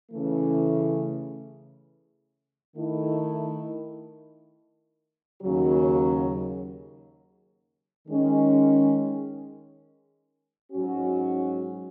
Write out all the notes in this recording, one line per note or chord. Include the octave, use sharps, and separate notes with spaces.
C#3 E3 A3
D#3 A3 E4
D#2 C#3 F#3
D#3 G#3 C#4
G#2 F#3 C#4 F#4